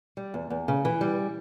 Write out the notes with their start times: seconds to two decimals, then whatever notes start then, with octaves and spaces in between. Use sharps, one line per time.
0.17 G3
0.34 E2
0.50 E2
0.68 C#3
0.85 E3
1.01 G3